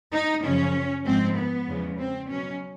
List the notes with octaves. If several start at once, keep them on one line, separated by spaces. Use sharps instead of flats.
D#4
F#2 C#3 F3 C#4
G#2 F3 G#3 C4
B3
E2 C#3 F3 G#3
C4
B2 F#3 C#4